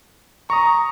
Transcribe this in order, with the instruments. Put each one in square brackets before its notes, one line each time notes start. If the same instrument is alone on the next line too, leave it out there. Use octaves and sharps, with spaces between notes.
[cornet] A#5 [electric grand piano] C#6 D#6